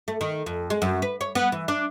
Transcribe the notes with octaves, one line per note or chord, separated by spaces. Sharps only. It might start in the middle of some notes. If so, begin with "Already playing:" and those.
A3
D#3
F2
G#3
F#2
B4
C#5
B3
E3
D4